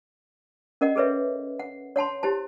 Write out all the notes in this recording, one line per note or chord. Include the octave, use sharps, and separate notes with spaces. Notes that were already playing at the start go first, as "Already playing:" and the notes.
C#4 A#4 D#5 F#5
G#4 A4 B4 C#5 E5
F#5
C#5 F#5 A5 C6
E4 G4 C5 A5